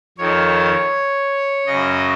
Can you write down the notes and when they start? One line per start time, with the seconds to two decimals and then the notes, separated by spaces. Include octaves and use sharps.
0.18 F2 D#3 C#5
1.67 F#2 C#3 D#5